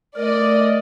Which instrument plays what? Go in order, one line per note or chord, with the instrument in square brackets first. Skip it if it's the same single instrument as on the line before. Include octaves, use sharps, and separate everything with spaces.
[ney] A3 [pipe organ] A#4 [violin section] D5 D#5